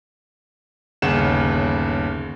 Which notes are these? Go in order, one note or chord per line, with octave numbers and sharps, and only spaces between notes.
G1 D#2 C#3 F#5 E7